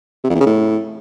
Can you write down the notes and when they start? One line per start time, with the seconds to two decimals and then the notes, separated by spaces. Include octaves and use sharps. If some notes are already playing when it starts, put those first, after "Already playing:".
0.24 C3
0.30 F2
0.35 E2
0.41 C#3
0.46 A2